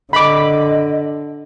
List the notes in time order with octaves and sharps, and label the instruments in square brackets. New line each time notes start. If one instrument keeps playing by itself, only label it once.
[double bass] D3 [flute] D#5 [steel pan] B5 D6